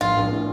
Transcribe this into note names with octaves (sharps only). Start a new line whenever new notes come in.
A#1 F4
A#1
A2